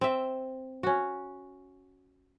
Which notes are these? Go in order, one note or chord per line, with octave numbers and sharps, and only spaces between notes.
C4 E5
C#4 F#4